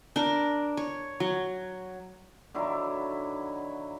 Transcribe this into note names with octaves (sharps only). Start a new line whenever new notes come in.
D4 A#4
C#5
F#3
D3 D#3 F#3 E4